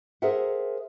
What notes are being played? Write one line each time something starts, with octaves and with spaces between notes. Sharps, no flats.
G#4 A#4 C5 E5 F#5